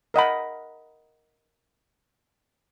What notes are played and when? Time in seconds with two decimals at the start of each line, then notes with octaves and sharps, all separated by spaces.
0.14 A#4 D#5 F#5 B5